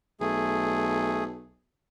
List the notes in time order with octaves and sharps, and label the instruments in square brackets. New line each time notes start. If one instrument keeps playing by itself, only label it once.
[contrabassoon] B1 [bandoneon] A3 G#4